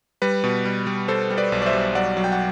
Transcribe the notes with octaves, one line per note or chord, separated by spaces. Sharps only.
G3 B4
B2
G3
G3
G3 A4 C5
G3
B4 D5
B1
D5
C5 E5
G3
F#3 D5 F#5
F#3
G5
F#5